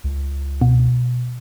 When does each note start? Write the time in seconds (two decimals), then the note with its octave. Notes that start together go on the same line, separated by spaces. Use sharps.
0.04 C#2
0.61 B2